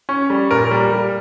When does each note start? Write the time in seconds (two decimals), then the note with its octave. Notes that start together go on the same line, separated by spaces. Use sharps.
0.09 C#4
0.30 G3
0.51 A#2 A#4
0.71 G3
0.93 G3